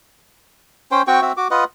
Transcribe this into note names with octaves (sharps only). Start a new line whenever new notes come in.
C#4 C5 G5
C4 F#4 G5 C#6
C4 F#4 E5
F#4 D6
F4 B4 D#5 F#5